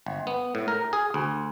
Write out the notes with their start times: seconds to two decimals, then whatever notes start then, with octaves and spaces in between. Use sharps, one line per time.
0.06 G1
0.27 B3
0.55 A2
0.68 A#4
0.93 G#4
1.14 D2